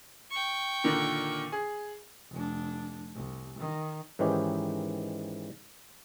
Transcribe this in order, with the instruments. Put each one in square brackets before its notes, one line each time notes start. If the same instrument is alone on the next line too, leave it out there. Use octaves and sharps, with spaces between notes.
[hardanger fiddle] G5 C#6
[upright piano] A#2 D3 D#3
G#4
[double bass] F1 D4
C2
D#3
[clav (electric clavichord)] G#2 D#3 E3 C#4 D#4 G4